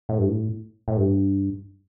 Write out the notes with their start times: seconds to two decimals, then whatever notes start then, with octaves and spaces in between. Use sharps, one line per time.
0.09 A2
0.18 G2
0.28 A2
0.88 A2
0.97 G2